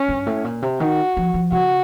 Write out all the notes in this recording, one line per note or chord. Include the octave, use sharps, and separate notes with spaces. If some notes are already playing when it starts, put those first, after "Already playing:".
Already playing: C#4
G2
A2
A#2
C3
D#3 F#4
F3
F3
C#3 F#4